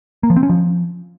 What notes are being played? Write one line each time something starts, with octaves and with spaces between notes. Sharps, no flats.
A#3
F3
C4
C#4
F3